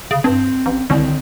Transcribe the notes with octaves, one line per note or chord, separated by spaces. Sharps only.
C#3
G2 C4
A1
C2 D3 D#3 C4